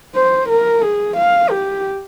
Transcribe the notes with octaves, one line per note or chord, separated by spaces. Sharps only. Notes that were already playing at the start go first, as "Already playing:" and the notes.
C5
A#4
G#4
F5
G4